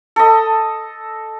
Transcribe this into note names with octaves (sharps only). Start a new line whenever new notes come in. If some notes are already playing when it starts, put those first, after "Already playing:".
A4 D#5